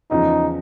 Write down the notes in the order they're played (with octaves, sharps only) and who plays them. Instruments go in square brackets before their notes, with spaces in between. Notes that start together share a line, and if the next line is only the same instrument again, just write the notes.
[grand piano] E2 C#3 F3 [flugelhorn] D#4